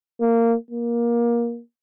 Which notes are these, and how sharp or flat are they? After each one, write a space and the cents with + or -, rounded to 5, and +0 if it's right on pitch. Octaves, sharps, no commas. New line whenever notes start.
A#3 -15
A#3 +20